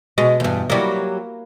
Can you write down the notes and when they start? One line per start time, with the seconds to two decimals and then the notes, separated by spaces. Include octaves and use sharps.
0.18 B2 G#3
0.40 E2 G2
0.70 F#3 G3 A#3 E4 C#5